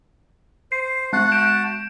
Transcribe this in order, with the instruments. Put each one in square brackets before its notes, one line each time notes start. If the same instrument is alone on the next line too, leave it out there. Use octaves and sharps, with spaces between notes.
[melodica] C5 [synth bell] C7
[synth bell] G#3 F#6 [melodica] F#4 F#5 A5
[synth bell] G6 D7 E7